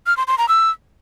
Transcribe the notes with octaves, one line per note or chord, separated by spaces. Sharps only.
F6
C6
C6
A#5
E6